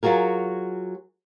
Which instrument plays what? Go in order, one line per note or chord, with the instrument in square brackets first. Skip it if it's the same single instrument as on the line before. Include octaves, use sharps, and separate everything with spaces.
[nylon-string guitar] F#3 F4 F#4 G#4 A#4